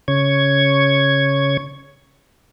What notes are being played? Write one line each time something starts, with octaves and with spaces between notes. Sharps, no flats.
C#3 C#5 C#6 G#6